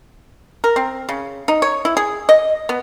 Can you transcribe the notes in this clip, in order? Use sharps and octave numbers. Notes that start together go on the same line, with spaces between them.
A#4
C4
C#3
D#4
C#5
E4
G#4
D#5
B3